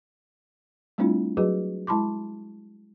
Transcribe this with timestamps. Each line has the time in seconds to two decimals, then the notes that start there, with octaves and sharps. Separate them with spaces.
0.98 G3 A3 C4 D4 E4 F4
1.37 F#3 F#4 G#4 B4 D#5
1.87 G#3 E4 A5 B5 C6 D6